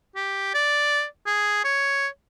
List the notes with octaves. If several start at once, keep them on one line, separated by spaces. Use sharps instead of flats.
G4
D5
G#4
C#5